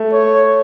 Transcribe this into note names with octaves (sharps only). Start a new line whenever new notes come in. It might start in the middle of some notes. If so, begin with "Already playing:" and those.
Already playing: A3
C#5